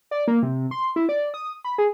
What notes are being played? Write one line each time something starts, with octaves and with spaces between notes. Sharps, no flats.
D5
A#3
C3
C6
E4
D5
D#6
B5
G#4